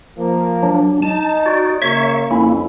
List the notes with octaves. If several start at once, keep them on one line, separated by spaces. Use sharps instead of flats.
F3 A#3
F#3 D4
D#4 A5
F#4 D5
C#3 A#3 C#5 E5 C#6
F2 A#3 C#4 E4